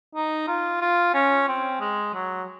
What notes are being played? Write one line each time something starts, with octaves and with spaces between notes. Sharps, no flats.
D#4
F4
F4
C#4
C4
G#3
F#3